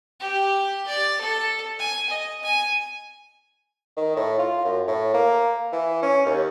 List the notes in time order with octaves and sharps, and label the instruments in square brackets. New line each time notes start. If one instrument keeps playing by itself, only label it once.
[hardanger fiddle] G4
D5
A4
G#5
D#5
G#5
[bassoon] D#3
A2
F4
F#2
A2
A#3
E3
C#4
D#2